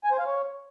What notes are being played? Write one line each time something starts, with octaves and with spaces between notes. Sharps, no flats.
G#5
C5
F5
C#5